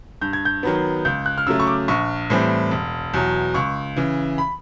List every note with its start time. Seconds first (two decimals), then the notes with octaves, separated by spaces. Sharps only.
0.21 G2 G6
0.33 G#6
0.45 G6
0.63 D#3 F#3 B3
1.05 C#2 G6
1.26 F#6
1.38 F6
1.47 C#3 F#3 A3 E6
1.60 C#6
1.67 D6
1.88 A#1 C#6
2.30 A2 E3 G3 C4
2.71 E1
3.14 E2 B2 F#3
3.54 C#2 C#6
3.97 C#3 E3
4.38 B5